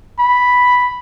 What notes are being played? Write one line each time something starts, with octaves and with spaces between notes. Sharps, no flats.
B5